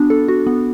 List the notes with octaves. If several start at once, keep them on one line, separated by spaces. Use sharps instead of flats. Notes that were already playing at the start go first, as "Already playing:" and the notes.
Already playing: B3 D4 F#4
A4
F#4
B3